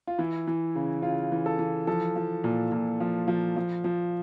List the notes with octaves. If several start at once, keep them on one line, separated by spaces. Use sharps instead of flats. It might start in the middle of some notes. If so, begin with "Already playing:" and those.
F4
E3 E4
E3
C#3
C#3 F4
E3
A4
E3
F3 A4
F3
A#2
A#2
F3
F3
F3
F3